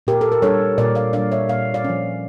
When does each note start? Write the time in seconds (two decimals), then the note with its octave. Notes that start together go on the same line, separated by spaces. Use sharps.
0.07 A#2 G4 A#4
0.21 A4
0.32 A#4
0.42 G3 D4 A4 C#5
0.78 A#2 A#4 D5
0.95 D5 F5
1.13 G3 D4 D5 F5
1.32 C#5 E5
1.49 A#2 F5
1.74 D5 F5
1.84 F3 C#4